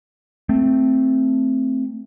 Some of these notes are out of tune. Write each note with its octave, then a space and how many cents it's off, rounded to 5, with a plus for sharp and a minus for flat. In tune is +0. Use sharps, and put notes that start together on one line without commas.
A3 +10 C4 +0